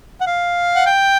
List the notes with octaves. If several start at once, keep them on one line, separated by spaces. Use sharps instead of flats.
F#5
F5
F#5
G5